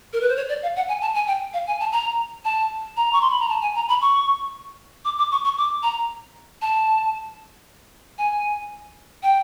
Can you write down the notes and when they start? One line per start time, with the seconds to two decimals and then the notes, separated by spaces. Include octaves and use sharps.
0.13 A#4
0.21 B4
0.29 C5
0.36 C#5
0.49 D5
0.63 F5
0.76 F#5
0.89 G#5
1.01 A5
1.15 G#5
1.27 G5
1.53 F5
1.67 G#5
1.80 A5
1.92 A#5
2.45 A5
2.97 A#5
3.13 C#6
3.21 C6
3.30 B5
3.39 A#5
3.49 A5
3.62 G#5
3.75 A#5
3.89 B5
4.02 C#6
5.05 D6
5.18 D6
5.31 C#6
5.44 C#6
5.58 D6
5.83 A#5
6.62 A5
8.18 G#5
9.23 G5